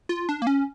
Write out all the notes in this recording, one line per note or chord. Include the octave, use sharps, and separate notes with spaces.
F4
D4
A#3
C#4